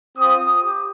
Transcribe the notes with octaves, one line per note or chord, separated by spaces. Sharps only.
C4 F4 D#6
G4